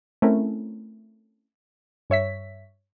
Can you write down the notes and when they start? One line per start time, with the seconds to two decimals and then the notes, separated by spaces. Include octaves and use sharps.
0.22 A3 C4 C#4 E4 A#4
2.10 G2 C#5 E5 B6